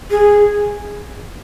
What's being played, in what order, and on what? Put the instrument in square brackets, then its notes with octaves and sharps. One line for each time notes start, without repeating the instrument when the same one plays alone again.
[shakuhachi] G#4